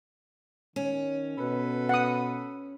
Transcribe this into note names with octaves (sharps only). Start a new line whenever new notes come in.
D#3 C#4
B2 A4 B4
F#5 D#6